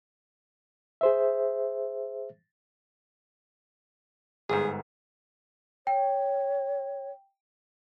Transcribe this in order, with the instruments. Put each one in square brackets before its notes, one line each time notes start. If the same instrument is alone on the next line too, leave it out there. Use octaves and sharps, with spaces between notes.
[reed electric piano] G#4 C5 E5
[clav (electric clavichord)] G1 G#2 [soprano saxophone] G#4
[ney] C#5 [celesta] G5